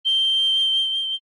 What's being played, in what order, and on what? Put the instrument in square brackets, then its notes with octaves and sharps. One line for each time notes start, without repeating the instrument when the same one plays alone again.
[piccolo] G7